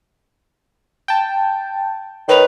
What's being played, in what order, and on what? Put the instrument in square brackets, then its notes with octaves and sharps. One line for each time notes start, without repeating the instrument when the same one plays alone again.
[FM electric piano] G5 A5
[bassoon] D#3 [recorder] B4 [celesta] C#5 F7